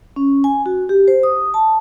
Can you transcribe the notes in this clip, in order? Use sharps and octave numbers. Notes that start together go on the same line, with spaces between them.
C#4
G#5
F#4
G4
C5
D#6
A5